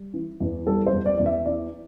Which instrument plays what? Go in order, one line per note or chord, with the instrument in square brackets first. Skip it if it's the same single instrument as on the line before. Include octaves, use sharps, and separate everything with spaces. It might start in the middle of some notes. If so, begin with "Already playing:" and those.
Already playing: [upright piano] G3
E3
E2
G3 A4
C5
E2
D5
E2 D5
E5
E3 D5